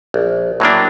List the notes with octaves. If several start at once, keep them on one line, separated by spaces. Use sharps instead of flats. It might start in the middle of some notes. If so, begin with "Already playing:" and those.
A#1
A2 F#3 A#3 D4